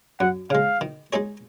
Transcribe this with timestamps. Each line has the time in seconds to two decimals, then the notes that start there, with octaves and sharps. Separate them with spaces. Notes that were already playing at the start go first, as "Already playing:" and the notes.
0.20 F#2 F#5
0.50 C#3 G#3 F5
0.81 D#3
1.13 G#3 D#4 G#4 C#5